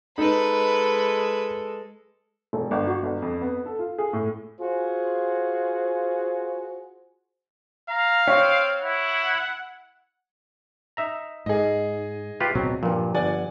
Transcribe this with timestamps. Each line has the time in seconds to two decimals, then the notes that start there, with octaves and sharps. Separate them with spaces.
0.18 G#3 D#4 A4 B4 B5
2.53 E1
2.71 G1
2.87 F#4
3.03 G1
3.22 F2
3.42 B3
3.66 A4
3.79 F4
3.98 G#4
4.13 A2
4.61 F4 F#4 G#4 C5
7.90 F5 A#5
8.28 C4 C#5
8.82 E4 F#5
10.97 D#4 E5 A#5
11.46 G#2 G#4 D#5
12.40 F4 G4 B4
12.55 D1 B2 F#3 C4
12.83 G2 A#2 F3
13.15 G1 D5 F#5 G#5